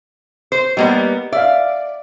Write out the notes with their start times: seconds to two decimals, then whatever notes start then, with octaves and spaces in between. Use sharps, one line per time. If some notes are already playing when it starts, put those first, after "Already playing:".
0.52 C5
0.77 G3 A#3 B3 D#5
1.33 D5 E5 F5